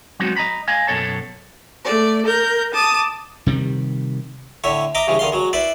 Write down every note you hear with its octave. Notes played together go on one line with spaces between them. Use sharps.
F#3 G#3 B3 C4 D#4 F#4
D#5 A#5 B5
D#5 F5 G#5
F#2 B2 A4 C#5 A5
A3 D5
A#4 G6
A5 D6 D#6
C3 D#3 G3
A2 D3 C#5 E5
D#5 E5 A#5 D6
G2 C#3 E3 G#3
D3 D#3 F5 C6
F#3 G#3
E4 B4 C5 D5